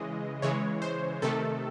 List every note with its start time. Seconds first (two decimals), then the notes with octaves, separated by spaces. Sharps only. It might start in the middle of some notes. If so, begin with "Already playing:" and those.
Already playing: C#3 E3 G#3 D#5
0.42 C#3 E3 G#3 C#5
0.82 C5
1.22 C3 D#3 A3 A4